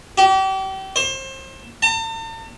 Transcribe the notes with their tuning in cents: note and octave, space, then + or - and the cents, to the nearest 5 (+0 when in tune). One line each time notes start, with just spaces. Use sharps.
G4 -35
C5 +30
A5 +45